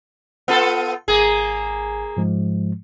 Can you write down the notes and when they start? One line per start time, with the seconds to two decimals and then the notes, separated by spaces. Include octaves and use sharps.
0.48 B3 F4 A4 F#5
1.08 G#1 A#3 G#4 G#5
2.17 G#2 F3 G#3